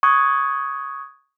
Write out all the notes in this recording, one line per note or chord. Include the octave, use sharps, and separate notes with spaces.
C#6 D#6 F#6 G#6